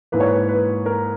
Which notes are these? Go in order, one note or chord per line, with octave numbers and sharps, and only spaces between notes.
G#2 E3 A#3 B4
C#5
B4
B4
A#4